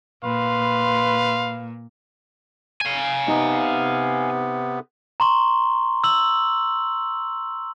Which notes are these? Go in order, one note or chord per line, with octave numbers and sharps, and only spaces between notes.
A#2 B4 F5 C6
F5 G#5
C3 B3 D#4
A#5 C6 C#6
E6 F#7